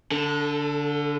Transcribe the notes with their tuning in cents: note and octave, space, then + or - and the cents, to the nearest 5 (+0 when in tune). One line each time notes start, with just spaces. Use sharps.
D3 -20 A4 +20